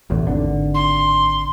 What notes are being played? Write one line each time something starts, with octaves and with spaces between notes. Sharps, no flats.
E1 A1 E2
G#1 D3
C6